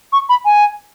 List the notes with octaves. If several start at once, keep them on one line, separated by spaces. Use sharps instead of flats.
C#6
B5
G#5